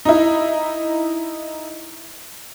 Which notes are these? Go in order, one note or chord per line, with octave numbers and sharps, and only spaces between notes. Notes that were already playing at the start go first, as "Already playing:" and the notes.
D#4 E4